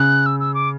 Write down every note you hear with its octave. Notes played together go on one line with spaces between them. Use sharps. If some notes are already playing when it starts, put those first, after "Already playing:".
Already playing: C#3 F#6
E6
E6
D6